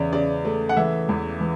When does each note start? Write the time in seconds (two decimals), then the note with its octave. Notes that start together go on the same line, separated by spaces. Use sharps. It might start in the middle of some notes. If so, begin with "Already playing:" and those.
Already playing: E2 C#3 D5
0.13 C#3 D5
0.45 A3
0.69 F#5
0.77 E3 E5
1.09 E2
1.41 E3